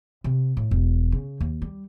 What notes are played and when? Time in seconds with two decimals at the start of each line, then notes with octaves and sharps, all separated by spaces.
0.24 C3
0.57 A2
0.71 E1
1.12 C#3
1.40 D#2
1.62 G3